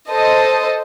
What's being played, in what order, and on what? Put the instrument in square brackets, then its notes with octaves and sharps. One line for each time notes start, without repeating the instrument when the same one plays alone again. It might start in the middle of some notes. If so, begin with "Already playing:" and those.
[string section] A4 C5 D#5